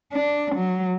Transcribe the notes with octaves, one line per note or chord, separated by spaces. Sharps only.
D4
F#3